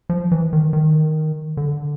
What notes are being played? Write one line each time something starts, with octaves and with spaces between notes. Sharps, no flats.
F3
E3
D#3
D#3
D3